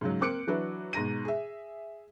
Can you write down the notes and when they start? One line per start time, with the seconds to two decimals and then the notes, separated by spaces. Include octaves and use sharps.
0.01 G#2 C#3 F#3
0.21 A#3 C4 D6 F#6 C#7 D7
0.47 E3 F#3 D4 F#4 B4
0.93 G#2 B2 A#5 A#6 D#7
1.25 G#4 E5